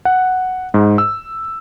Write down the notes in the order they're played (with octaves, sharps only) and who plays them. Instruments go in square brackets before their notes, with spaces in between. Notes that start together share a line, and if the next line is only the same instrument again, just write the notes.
[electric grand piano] F#5
G#2
E6